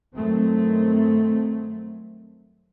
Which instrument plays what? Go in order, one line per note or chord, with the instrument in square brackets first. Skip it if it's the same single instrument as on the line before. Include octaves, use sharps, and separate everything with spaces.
[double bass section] G2 D#3 F#3 A3 C4